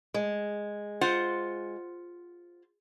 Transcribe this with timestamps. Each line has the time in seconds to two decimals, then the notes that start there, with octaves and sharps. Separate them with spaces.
0.14 G#3
1.01 F4 C5 F#5